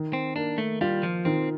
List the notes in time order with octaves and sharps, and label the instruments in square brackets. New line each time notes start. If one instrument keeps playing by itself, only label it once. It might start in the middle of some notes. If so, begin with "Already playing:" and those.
Already playing: [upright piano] D#3
[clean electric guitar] C4
[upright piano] A#3 [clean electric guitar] D4
[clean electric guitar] A3
[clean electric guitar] G3 [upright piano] F4
[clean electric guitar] F3
[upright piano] D#3 [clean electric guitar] C4